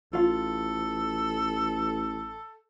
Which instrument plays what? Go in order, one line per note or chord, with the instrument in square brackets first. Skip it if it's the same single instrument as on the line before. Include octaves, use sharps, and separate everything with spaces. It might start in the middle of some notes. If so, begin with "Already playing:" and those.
[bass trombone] A1 [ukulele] F4 F5 [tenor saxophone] A4